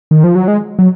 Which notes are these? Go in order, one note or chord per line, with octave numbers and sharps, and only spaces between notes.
D#3
F3
F#3
G#3
F#3